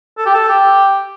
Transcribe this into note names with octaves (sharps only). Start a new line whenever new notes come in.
A4
G4
A4
G4